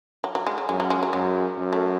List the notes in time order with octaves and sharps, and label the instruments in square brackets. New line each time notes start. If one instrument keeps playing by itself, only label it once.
[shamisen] F#3
F#3
G#3
F#3
[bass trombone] F#2 [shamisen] G#3
[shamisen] F#3
G#3
F#3
[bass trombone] F#2 [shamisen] G#3
[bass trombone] F#2
[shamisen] A3